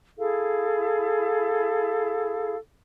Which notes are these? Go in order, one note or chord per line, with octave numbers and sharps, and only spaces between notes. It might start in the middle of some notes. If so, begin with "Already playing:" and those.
E4 G#4 A4 F5